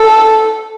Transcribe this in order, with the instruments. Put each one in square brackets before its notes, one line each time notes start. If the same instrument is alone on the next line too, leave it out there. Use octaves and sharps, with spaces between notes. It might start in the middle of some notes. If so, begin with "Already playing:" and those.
Already playing: [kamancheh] A4